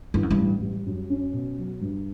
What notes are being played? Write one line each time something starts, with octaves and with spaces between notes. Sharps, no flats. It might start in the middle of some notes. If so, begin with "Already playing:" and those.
G2 E3
F#2
G2
A1
G3
F#2
C#4
B2
F#3
G2